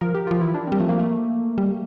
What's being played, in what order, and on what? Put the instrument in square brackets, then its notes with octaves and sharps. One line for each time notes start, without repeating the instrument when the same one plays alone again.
[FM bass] F3 [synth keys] A#4
[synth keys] G4
[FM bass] F3 [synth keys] F4
[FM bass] E3 [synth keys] E4
[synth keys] D4
[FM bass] G3 [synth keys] C4
[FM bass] F3 [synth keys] A3
[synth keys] A#3
A3
[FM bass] G3